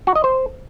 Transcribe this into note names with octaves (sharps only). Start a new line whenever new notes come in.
F#4
D#5
C5